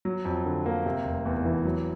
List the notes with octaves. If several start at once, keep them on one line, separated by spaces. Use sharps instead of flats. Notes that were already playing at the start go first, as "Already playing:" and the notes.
F#3
F2
D3
A#3
C3
F1
E2
E3
F#3